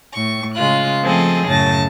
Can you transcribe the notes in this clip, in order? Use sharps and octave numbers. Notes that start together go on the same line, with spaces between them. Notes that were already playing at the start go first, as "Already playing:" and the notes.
A2 C#6
C#3 G#3 F4 F#6
F3 A3 C4 G#4 A4 D#5
F#2 A2 C#3 A5 A#6